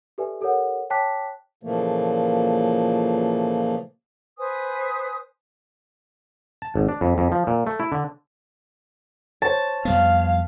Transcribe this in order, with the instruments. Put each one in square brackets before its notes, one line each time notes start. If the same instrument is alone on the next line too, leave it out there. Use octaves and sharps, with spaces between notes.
[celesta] G4 A4 B4 D5 E5 G#5
G4 A4 A#4 C#5 F#5
C#5 G5 A5 D6 F#6 B6
[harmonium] A#2 C#3 E3 F3 A3 A#3
[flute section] B4 C5 G#5 D#6
[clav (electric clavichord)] A5
G#1
D4
F2
F2
F3
A#2
A3
E4
D3
[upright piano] C5 C#5 [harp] A5
[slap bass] F2 G3 B3 [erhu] F5